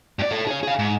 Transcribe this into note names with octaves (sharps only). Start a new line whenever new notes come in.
G2 D5
A4 C#5
G#4 C#5
G#4 F5
G#2